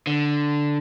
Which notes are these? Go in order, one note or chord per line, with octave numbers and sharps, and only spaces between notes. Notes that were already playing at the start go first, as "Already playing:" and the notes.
D3